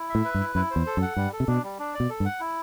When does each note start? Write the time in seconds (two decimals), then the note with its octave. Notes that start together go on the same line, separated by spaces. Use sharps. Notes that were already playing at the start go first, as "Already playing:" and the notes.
Already playing: E4
0.09 E5
0.15 A2
0.25 B4
0.34 G2
0.40 E4
0.55 F#2 E4
0.71 C5
0.76 E2
0.86 A4
0.97 F#2
1.02 F#5
1.16 G2 G3
1.33 A4
1.40 C3
1.48 B2 D4
1.63 G3
1.79 D4
1.94 D5
2.00 B2
2.09 A4
2.20 G2
2.25 F#5
2.40 E4